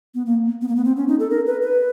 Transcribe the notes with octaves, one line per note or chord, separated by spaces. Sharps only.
B3
A#3
B3
A#3
B3
C4
C#4
D#4
A4
A#4
B4
B4